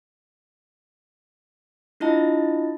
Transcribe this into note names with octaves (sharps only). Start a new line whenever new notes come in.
D4 E4 F4 D#5 A5